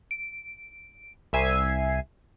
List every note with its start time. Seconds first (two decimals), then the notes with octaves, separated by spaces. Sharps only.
0.11 D7
1.33 C2 E5 G#5 C7